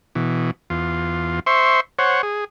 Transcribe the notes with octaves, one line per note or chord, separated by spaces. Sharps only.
B2 E3
E2 F4
C5 E5 C6 C#6
C5 C#5 F#5
G#4